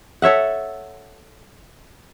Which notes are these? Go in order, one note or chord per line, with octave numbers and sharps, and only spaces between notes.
A4 C#5 E5 F#5